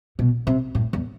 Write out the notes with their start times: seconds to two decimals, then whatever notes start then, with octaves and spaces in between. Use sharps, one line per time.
0.19 B2
0.47 C3
0.75 A2
0.93 E2